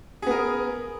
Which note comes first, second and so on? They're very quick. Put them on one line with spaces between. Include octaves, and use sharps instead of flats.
G#4 B3 A#4